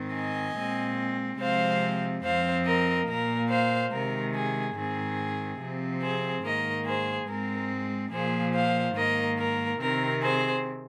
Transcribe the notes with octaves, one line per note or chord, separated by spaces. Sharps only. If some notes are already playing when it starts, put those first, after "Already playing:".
Already playing: G#2 D#3 C4
D#5 G#5
A#2 G#3 C4
C3 F3 G#3 C4 C5 F5
F2 F3 C4 C5 F5
A#4 D#5
A#2 A#3 A#4
C5 F5
C3 D#3 G#3 A#4
G#4
G#2 D#3 C4 G#4
C3 F3 C4
G#4 C5
G#2 D#3 A#3 A#4 D#5
G#4 C5
G#2 G#3 C4 A#4
A#2 F3 A#3 G#4 C5
C5 F5
G#2 D#3 A#3 A#4 D#5
A#4
C3 D#3 C4 A#4
G#4 C5